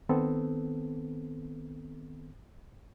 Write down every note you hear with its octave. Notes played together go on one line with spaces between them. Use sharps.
D#3 B3 C4 A4